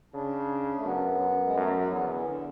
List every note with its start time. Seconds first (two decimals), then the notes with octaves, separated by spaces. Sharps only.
0.14 C#3 D4
0.77 A3
0.84 F#2 B3
1.20 F#2
1.46 G#3
1.55 F#2 A3
1.73 F#3
1.91 E2 B3
2.04 D3
2.08 E3
2.26 D3